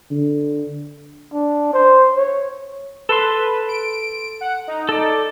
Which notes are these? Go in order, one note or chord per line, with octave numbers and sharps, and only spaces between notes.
D3
D4
C5
C#5
A4 B4 C6
D7
F#5
D#4
A4 D5